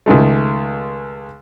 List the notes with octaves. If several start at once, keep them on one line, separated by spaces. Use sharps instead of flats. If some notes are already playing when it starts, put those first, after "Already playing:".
C#2 D#3 G#3 A3